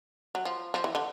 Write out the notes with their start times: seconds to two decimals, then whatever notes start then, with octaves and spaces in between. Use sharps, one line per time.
0.35 F#3
0.45 F3
0.74 F3
0.84 E3
0.95 D3